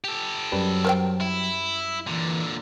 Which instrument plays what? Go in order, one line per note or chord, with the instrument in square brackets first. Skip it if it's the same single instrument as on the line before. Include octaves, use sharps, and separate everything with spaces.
[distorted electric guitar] G4 A4
[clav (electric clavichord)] F#2 G3 B4 [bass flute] F#3
[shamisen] A#4 C5 G5
[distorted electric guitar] E4
[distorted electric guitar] A#2 D3 [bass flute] E3